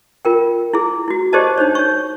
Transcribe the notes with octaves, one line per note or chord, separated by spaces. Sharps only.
F4 A#4 G5
E4 G#4
E4 F#4
G4 G#4 C5 D5 D#5 A5
D4 D#4 C5 C#5
C#5 C#6